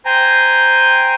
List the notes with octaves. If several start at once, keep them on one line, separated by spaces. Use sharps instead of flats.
C5 G5 G#5 A#5